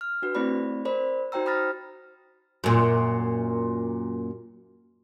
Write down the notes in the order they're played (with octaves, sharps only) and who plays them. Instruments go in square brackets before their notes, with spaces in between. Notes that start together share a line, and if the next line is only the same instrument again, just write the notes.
[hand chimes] F6
D4 F#4 B4
A3 C4 E4 G4 D5 B5
A#4 C5 D5 B5
D#4 F#4 C5 G5 A#5 E6
A#5 B5 D#6 F6 A6 A#6
[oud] F#2 A#2